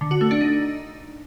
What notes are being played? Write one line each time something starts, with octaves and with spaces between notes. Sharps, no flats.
D3
F#4
A3
D4
D#4